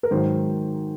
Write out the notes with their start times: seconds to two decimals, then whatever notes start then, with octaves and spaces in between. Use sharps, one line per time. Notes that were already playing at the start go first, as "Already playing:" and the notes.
0.03 A#4
0.11 G#2 D#3 F#3 C5